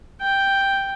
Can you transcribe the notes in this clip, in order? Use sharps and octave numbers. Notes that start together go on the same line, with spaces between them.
G5